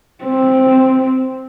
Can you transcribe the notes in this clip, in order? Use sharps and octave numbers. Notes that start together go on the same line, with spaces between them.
C4